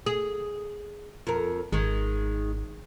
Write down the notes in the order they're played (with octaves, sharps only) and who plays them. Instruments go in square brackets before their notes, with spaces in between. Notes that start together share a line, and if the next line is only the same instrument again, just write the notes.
[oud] G#4
F2 A#4
[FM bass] G#1 [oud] D#3 G#3